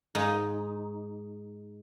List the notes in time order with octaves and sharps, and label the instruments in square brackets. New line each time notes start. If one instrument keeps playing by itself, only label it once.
[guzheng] G#2 D#4